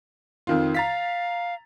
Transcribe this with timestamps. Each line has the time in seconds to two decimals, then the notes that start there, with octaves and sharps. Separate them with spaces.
0.47 F2 D#3 F4
0.74 F5 A#5 A6 B6